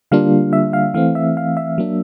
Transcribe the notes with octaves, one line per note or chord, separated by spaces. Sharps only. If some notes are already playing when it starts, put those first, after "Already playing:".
D3 G3 A#3 D4 F4 F5
E5
F5
E3 A3 C4 F5
E5
F5
E5
F#3 A#3 D4